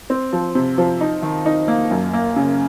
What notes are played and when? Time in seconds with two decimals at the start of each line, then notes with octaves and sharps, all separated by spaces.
0.10 C4
0.33 F3
0.55 C3
0.78 F3
1.01 D#4
1.22 D#3
1.46 D#4
1.68 A#3
1.91 F#2
2.13 A#3
2.36 C#3